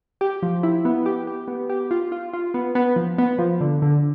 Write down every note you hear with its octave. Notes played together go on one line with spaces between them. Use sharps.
G4
F3
E4
B3
G4
G4
B3
G4
F4
F4
F4
B3
B3
F3
B3
F3
D3
D3